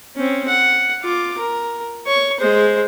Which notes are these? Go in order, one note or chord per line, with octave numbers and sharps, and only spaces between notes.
C4 C#4
F#5
F4 D6
A#4
C#5 C#6
G#3 C5